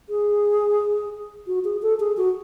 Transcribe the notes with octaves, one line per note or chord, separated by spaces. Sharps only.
G#4
F#4
G#4
A4
G#4
F#4